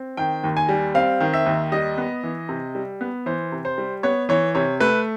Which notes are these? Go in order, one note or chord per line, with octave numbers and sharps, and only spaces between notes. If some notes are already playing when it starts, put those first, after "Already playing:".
Already playing: C4
D#3 G5
D#2
G#5
G3
C4 F5
D#3
E5
D#2
G3 D#5
B3
E3
C3
G3
B3
E3 C5
C3
C5
G3
B3 C#5
E3 C#5
C3 C#5
A3 B4